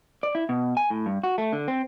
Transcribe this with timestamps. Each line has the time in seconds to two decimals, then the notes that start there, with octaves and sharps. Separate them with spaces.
0.23 D5
0.35 E4
0.49 B2
0.77 G#5
0.90 A2
1.06 G2
1.24 F#4
1.38 A3
1.53 D3
1.68 C4